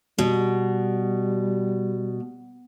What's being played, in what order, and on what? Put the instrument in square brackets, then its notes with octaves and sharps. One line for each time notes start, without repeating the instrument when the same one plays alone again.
[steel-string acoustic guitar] B2 [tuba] G3